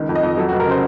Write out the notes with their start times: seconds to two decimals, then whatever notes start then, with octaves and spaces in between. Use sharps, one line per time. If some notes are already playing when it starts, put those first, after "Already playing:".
Already playing: C#2 D#3
0.09 F2
0.15 D#5
0.23 F2
0.38 F#3 A4
0.49 F#4
0.52 F1
0.60 A#4
0.67 C#3 C5